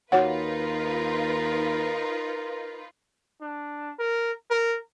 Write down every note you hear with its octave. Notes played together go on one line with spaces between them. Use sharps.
D#2 D#4 F4 F#4 A#4 B4 C#5 F#5
D4
A#4
A#4